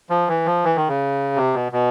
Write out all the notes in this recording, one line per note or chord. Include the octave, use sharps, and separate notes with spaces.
F3
E3
F3
E3
D#3
C#3
C3
B2
B2